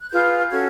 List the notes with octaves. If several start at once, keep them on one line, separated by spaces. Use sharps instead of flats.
F#6
F4 G#4 B4 G6
C#4 F#4 A4 G#6